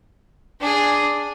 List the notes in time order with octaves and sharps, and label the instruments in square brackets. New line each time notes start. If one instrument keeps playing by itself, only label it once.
[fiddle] D4 G#4